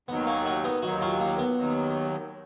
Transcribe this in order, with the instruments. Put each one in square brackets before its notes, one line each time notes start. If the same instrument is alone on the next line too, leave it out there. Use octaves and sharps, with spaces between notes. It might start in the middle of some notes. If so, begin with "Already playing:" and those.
[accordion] D#2 D#3 F#3 [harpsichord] B3
[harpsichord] A#3 C#4
D#4 F#4
B3 D#4
[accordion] D#2 D#3 F#3 [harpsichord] D#4 F#4
[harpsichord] C#4 F4
A#3
B3
[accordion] D#2 D#3 F#3